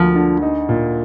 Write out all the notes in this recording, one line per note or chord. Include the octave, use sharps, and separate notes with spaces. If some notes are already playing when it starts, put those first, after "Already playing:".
Already playing: D2 F3 A#3
D3
D#4
A#2